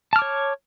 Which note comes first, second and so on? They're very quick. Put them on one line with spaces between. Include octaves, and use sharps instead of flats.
A5 F6 D6 C#5